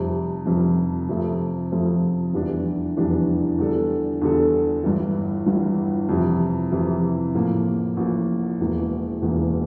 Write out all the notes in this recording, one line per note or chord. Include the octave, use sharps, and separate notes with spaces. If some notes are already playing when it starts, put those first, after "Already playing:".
Already playing: F1 F2 C3 G3
F1 F2 C3 G3
F2 C3 F3 A3
F2 C3 F3 A3
F1 E2 E3 G3 D4
F1 E2 E3 G3 D4
E2 D3 G3 D4 A4
E2 D3 G3 D4 A4
G1 G2 E3
G1 G2 E3
F2 C3 E3
F2 C3 E3
A1 A2 F3 A#3
A1 A2 F3 A#3
E1 E2 E3 A#3
E1 E2 E3 A#3